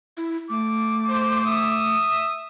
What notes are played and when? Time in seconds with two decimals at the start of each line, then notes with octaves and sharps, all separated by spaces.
0.17 E4
0.49 A3 D6
1.09 C5
1.44 E5 D#6